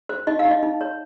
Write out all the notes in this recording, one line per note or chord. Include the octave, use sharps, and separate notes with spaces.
C5
D#4 D#5
F5
D#4
D#5
D#4
C#5